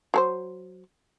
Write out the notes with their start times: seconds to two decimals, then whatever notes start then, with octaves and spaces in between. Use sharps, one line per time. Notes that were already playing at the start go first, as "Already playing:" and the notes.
0.14 F#3 A4 C5